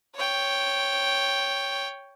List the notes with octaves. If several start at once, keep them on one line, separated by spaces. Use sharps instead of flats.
C#5 G5